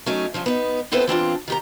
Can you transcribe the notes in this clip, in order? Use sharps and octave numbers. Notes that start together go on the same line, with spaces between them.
F#3 A3 C#4 D#4
G2 C#3 F3
B3 D#4
B3 C4 E4 A4 B4 C5
E3 C4 D4 F4
D#3 G4 A#5